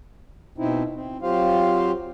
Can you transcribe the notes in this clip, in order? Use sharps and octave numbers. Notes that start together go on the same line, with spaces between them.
B2 C4 D#4 E4
C4
F#3 C4 F4 G4 C5 F5